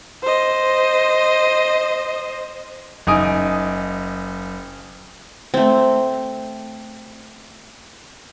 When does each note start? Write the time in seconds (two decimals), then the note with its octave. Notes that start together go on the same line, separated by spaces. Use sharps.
0.23 C5 D#5
3.07 F#1 D#4 G#5 D#6 D7
5.54 A3 C4